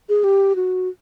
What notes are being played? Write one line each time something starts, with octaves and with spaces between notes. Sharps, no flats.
G#4
G4
F#4